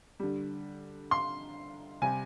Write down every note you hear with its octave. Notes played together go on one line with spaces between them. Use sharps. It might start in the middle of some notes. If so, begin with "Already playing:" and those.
D3 G3
C6
C3 G3 G#5